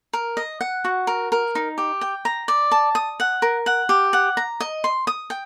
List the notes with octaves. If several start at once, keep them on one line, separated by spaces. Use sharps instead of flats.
A#4
D#5
F#5
F#4
A#4
A#4
D#4
G4
G5
A#5
D5
A5
D#6
F#5
A#4
F#5
G4
F#5
A#5
D#5
C6
D#6
G5